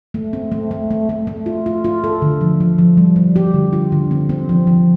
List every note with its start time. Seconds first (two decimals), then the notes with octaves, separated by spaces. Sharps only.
0.14 A3
0.33 C4
0.52 A3
0.71 A3
0.91 A3
1.09 A3
1.27 A3
1.46 F4
1.66 F4
1.84 F4
2.04 A4
2.22 D3
2.41 F3
2.60 F3
2.78 F3
2.97 G3
3.16 G3
3.36 G4
3.54 D3
3.73 F4
3.92 D3
4.11 C4
4.29 C4
4.49 F3
4.67 F3